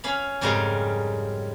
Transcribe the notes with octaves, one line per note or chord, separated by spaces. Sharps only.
C#4 F5 B5
F2 G#2 C#3 G3 A#4 F5